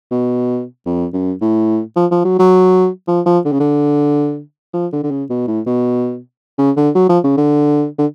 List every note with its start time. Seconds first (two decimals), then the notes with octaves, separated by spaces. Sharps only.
0.11 B2
0.86 F2
1.13 F#2
1.41 A2
1.96 F3
2.11 F3
2.25 F#3
2.39 F#3
3.07 F3
3.26 F3
3.45 D3
3.52 C#3
3.60 D3
4.73 F3
4.93 D3
5.03 D3
5.11 C#3
5.30 B2
5.47 A2
5.66 B2
6.58 C#3
6.77 D3
6.95 F#3
7.09 F3
7.24 C#3
7.37 D3
7.98 D3